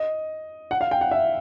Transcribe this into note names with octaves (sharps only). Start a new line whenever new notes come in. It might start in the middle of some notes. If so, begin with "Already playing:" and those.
Already playing: D#5
F#5
F5
G5
F#5
E5